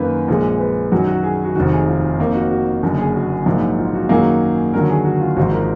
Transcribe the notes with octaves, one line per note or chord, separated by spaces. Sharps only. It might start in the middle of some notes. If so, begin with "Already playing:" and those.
Already playing: F#2 D#3 A#3 B4
A#1 A#2 G#3
B4
F#2 D#3 F#3 F#4
F#4
G#4
F#4
F1 D#2 D#3 F#4
G#4
F4
F2 D#3 A#3
F#4
F#4
F#1 F#2 D3 F#4
G#4
F#4
A#1 G#2 F#3 A#3
F4
F#4
F#2 D#3 F#3 A#3 G#4
D#2 D3 F#3 A#4
G#4
F#4
F4
G#1 G#2 F3 F#4
A#4